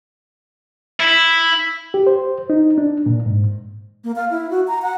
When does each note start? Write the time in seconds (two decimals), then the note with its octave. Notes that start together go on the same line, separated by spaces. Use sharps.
1.00 E4
1.94 G4
2.07 C5
2.50 D#4
2.78 D4
3.06 A#2
3.26 G#2
4.04 A#3
4.16 F5
4.30 E4
4.51 F#4
4.68 A#5
4.82 F#5